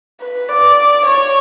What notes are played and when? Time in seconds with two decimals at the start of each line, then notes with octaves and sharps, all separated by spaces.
0.20 B4
0.49 D5
1.06 C#5